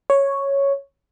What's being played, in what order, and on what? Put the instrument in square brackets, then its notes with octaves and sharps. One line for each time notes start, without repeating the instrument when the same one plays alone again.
[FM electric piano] C#5